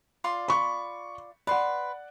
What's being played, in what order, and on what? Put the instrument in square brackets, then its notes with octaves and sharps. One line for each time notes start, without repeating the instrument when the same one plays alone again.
[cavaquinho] F4 D5 C6
[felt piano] B5 C#6
[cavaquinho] B4 C6 [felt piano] D5 F#5